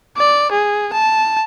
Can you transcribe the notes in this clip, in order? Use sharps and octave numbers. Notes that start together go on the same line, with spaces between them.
D5
G#4
A5